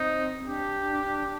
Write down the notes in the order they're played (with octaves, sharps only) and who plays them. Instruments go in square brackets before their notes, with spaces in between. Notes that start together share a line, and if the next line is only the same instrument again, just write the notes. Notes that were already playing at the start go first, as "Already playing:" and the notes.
Already playing: [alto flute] C4 [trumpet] D#4
[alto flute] D4 [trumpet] G4